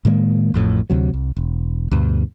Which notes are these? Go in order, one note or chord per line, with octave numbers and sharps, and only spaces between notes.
A2 D#3 G#3 A#3
A1 F2 A2
D2 C3 F#3
C2
E1
D2 G2 B2